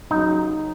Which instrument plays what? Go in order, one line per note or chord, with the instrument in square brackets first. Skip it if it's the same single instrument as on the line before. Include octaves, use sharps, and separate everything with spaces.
[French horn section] D#2 C#3 F#3 [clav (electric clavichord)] D#4